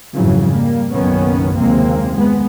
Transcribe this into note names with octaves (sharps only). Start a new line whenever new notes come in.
F2 G#2 C#3 E3 F#3
G3 A#3
F#1 B1 D#3 B3 C#4
F#1 D#2 C3 G#3 A#3 C4
G#3 B3